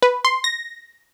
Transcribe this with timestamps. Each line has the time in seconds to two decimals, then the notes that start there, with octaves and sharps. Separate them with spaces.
0.02 B4
0.25 C6
0.44 A#6